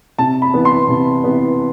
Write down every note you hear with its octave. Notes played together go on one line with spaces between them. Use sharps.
C3 A5
B5
E3 B3
C6
C3
E3 B3